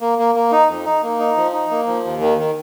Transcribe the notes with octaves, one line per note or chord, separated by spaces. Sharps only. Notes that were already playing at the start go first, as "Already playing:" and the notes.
A#3
A#3
A#3
D#4
F2
D#4
A#3
D#4
F3
D#4
A#3
F3
D#2
D#3
D#3